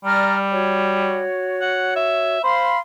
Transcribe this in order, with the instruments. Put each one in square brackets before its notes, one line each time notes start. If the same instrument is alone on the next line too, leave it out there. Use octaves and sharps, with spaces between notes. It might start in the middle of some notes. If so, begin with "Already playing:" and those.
[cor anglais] G3 [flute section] D5 A#5 F6
[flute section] F#4 C#5
[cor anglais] F#5
E5
[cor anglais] C5 [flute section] F5 B5 C6